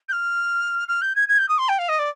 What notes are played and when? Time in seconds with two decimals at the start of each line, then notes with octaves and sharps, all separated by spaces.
0.09 G6
0.13 F6
0.88 F6
1.02 G6
1.16 G#6
1.29 G#6
1.38 G6
1.49 D#6
1.58 C6
1.69 G5
1.79 F5
1.89 D#5
1.99 D5